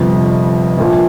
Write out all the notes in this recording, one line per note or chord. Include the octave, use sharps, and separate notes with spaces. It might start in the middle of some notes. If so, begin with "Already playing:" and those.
Already playing: G1 F2 C3
A#1 A#2 F3